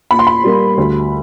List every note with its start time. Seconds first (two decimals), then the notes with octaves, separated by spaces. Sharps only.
0.11 A#2 B5
0.19 C6
0.27 B5
0.44 G3 A#3
0.77 D2